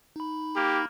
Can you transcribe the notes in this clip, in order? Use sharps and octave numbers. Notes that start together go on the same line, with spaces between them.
D#4 B5
A#3 G4